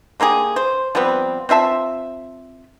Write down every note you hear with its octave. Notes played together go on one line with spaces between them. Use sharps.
D3 A#3 G4 G#4
C5
F3 G3 B3 C4
C4 F4 E5 A5